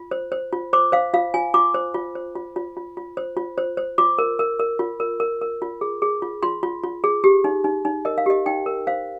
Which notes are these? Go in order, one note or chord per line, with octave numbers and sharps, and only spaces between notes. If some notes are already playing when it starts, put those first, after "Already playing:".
Already playing: F4
C5
C5
F4
C5 D6
C5 F5
F4 F5
F4 G#5
F4 D6
C5
F4
C5
F4
F4
F4
F4
C5
F4
C5
C5
F4 D6
A#4
A#4
A#4
F4
A#4
A#4
A#4
F4
G#4
G#4
F4
F4 C6
F4
F4
G#4
G4
D#4
D#4
D#4
A#4 D#5
F5
G4 D#5
D#4 G5
A#4
C5 F5